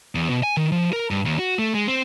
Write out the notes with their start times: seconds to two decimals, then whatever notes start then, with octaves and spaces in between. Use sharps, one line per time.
0.15 E2
0.30 B2
0.43 G#5
0.57 D#3
0.72 F3
0.93 A#4
1.11 G2
1.26 D#2
1.39 F#4
1.59 A3
1.75 G#3
1.88 C4